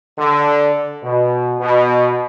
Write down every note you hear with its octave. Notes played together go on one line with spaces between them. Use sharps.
D3
B2
B2